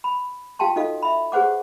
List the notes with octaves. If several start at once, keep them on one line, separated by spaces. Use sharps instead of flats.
B5
F4 G4 F5 G5 A5 C6
D#4 F4 F#4 A4 D#5 F5
E5 B5
G4 G#4 B4 C5 F#5 D6